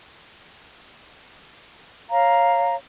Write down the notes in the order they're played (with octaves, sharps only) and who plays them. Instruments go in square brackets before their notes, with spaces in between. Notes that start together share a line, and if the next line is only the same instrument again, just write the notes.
[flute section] C#5 F5 A#5